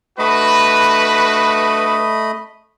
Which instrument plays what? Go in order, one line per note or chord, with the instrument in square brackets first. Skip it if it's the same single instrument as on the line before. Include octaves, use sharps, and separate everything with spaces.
[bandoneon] A3 D#5 B5 [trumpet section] D4 F#4 B4